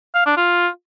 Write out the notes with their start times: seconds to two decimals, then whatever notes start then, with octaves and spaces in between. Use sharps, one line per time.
0.15 F5
0.26 D4
0.37 F4